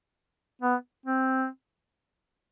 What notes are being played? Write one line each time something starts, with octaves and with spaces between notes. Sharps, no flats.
B3
C4